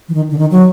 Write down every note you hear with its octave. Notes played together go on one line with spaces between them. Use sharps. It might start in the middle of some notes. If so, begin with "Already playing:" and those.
E3
D#3
D3
D#3
F#3